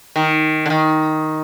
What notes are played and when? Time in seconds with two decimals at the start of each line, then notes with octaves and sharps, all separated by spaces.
0.16 D#3
0.66 D3
0.70 D#3